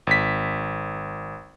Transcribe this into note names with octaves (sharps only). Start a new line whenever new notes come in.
G#1 B6